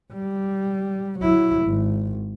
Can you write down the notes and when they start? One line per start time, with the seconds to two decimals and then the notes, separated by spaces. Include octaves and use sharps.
0.13 G3
1.19 F#3 E4
1.66 G#1